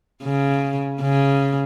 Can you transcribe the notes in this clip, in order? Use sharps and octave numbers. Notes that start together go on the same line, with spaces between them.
C#3
C#3